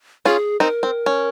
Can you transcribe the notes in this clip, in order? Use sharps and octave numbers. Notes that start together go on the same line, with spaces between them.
C#4 F4 G#4
C4 D#4 A#4
C4
C#4